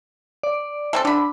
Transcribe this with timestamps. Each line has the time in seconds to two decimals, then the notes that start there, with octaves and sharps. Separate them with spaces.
0.43 D5
0.93 A3 C4 A4
1.05 D3 D4 B5